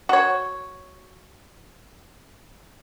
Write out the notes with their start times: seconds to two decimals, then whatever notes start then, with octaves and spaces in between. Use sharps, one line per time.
0.09 F#4 C#5